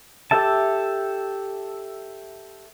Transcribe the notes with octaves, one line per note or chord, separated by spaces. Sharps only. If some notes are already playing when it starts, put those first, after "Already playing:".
G4 A4 E5 A5